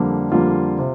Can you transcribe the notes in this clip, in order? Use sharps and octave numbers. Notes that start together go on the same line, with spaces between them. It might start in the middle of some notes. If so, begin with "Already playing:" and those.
Already playing: F2 D3 G3 A#3
F2 D3 G3 A#3 F4
C3